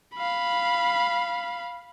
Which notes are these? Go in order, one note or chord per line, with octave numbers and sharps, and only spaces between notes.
F5 B5